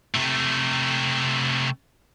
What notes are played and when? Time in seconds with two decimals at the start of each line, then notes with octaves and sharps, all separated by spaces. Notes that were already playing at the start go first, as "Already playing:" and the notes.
0.15 C3 A3